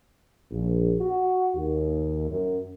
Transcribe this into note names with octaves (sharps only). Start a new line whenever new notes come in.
A#1
F#4
D#2
F#2